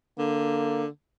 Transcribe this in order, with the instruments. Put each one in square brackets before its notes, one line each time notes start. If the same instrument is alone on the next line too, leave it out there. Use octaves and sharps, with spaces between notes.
[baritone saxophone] D3 [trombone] A#3